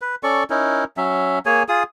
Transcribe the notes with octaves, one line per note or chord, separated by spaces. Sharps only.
B4
C#4 A4 D5 C#6
C#4 D#4 E4 A#4
F#3 C#4 E5
A#3 G#4 C#5 G#5
F4 G#4 D#6